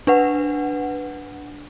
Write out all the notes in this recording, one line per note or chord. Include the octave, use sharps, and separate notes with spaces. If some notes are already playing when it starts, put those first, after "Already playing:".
D4 B4 F#5